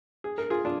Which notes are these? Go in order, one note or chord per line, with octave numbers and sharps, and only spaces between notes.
G#4
A#4
F4 G#4
D4 F4